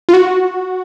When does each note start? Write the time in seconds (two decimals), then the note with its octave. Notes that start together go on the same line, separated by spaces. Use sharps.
0.09 F4
0.14 F#4